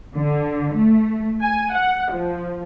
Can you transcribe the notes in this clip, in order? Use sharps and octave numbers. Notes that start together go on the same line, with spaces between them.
D3
A3
G#5
F#5
F3